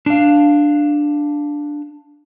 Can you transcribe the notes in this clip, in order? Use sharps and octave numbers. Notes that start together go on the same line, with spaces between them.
D4 F5